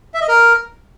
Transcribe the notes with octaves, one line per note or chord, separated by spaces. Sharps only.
E5
D#5
A#4